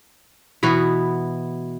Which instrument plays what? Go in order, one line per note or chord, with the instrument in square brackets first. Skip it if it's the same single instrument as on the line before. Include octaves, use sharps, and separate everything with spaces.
[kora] B2 E3 B3 F#4